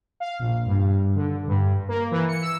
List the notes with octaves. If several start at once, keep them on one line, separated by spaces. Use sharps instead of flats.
F5
A#1
G2
D3
G2
A#3
E3
C#7
E6